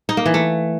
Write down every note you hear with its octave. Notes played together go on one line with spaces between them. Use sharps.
D#4
A#3
E3
A3